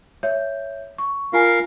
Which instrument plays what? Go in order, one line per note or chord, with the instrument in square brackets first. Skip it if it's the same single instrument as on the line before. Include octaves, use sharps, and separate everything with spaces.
[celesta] C#5 E5 G6
C#6
[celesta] F4 G#5 [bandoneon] A#4 F5